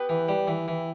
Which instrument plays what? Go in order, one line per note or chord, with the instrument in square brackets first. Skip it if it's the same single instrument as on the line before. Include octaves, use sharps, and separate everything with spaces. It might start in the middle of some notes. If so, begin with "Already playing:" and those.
Already playing: [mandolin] B3 G4 B4
[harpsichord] E3
G3
E3
E3